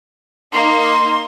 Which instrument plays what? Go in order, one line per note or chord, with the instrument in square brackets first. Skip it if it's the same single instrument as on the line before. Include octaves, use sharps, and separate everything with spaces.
[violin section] A#3 D#4 [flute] C6